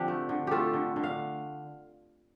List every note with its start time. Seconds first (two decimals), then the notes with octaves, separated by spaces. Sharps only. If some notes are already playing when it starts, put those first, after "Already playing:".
Already playing: D3 F3 C4 D4 G4
0.08 A3
0.29 D3
0.47 A3 F4 G4 A4
0.74 D3
0.96 D3
1.04 F5